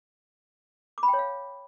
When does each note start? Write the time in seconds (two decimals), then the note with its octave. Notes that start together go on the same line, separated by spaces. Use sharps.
0.98 D6
1.03 B5
1.08 G5
1.13 C#5
1.19 F5